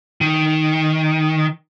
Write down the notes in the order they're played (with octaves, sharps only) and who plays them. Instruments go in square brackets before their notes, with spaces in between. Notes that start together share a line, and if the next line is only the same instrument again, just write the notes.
[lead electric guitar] D#3